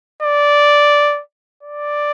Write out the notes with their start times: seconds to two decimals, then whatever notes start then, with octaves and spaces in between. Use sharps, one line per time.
0.23 D5
1.63 D5